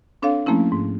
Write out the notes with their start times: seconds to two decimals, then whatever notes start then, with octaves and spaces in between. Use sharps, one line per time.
0.22 C4 D4 A4 C#5 F5
0.46 F3 A3 A#3 C4 C#4 E4
0.72 G#2